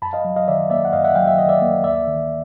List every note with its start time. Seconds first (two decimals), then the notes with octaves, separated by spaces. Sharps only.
0.02 F#2 A5 B5
0.13 D#5 F5
0.25 F#3
0.36 D#5 F5
0.48 D#3 D5 E5
0.70 A#3 D5 E5
0.85 F#5
0.93 F#2 D#5 F5
1.04 E5 F#5
1.15 F#3 F5 G5
1.27 E5
1.38 D#3 D#5
1.49 D5 E5
1.62 A#3
1.84 D2 D5 E5
2.07 D#3